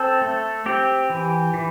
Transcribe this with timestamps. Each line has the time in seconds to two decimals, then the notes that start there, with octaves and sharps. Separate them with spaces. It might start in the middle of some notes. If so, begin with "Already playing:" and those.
Already playing: C4 A4
0.21 A3
0.66 C4 G4
1.10 E3
1.54 E3